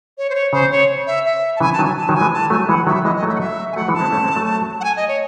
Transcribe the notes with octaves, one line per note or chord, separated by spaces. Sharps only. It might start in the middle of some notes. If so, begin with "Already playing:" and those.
C#5
C5
C#5
C#3 C5
C#5
E5
E5
A5
C#3 E3 G#5
A5
D#3 F#3
G#5
A5
D#3 F#3
G#5
E3 G#3
A5
F#3 A3 G#5
E3 G#3 F#5
D#3 F#3 E5
E3 G#3 D#5
D#5
F#3 A3
E5
F#5
E5
G#5
F#3 A3 F#5
E3 G#3
A5
G#3 C4
A3 C#4
G#3 C4
F#3 A3
F#5
G#5
D#5
C#5